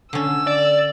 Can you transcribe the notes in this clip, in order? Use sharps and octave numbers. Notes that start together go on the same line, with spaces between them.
D3 C#4 E6
D5